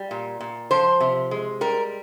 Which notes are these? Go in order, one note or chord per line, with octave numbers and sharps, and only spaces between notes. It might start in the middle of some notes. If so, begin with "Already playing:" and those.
Already playing: G3
A#2
A#2
F3 C5
C3
G#3
G3 A#4